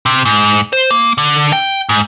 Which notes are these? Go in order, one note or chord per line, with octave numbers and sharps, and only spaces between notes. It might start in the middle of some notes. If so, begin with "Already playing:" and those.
C3
G#2
C5
A#3
D3
G5
G#2